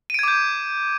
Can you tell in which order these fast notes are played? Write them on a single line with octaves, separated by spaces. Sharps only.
D#7 D7 G#6 D6 G6